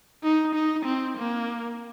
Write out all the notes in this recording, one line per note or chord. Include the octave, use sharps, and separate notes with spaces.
D#4
D#4
C4
A#3